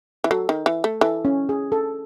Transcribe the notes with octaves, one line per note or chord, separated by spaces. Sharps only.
E3
F#3 A4
D#3
E3
A3
E3 A4
C#4
G#4
A4